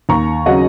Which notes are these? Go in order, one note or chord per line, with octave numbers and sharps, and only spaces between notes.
D#2 A#5 C#6
C#3 F#3 D#5 F#5